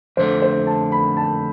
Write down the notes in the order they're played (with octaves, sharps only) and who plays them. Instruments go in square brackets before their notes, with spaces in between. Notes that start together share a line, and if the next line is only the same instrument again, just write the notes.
[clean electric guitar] F2 D3 A3 [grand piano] C5
[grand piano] C5
A5
B5
A5